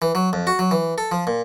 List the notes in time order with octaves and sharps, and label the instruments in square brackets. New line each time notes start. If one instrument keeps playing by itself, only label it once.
[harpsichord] E3
F#3
F2
F#4
F#3
E3
A4
F3
A#2